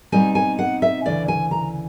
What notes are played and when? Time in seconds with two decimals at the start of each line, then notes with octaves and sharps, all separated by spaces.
0.12 B2 G3 C4 D#4 G#5
0.35 G#5
0.59 F#5
0.82 E5
1.06 D2 C#3 E3 D5
1.28 G#5
1.51 A#5